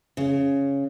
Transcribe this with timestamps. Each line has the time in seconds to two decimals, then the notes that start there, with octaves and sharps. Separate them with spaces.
0.17 C#3